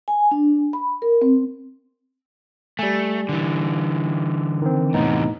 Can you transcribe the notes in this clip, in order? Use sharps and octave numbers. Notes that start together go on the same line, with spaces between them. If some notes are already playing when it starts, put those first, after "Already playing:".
G#5
D4
B5
A#4
C4
G3 A3 G#5
D3 E3
D#3 C4
E2 A2 C3 B3 D#4